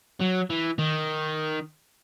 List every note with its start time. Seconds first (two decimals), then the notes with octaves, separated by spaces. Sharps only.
0.21 F#3
0.50 E3
0.79 D#3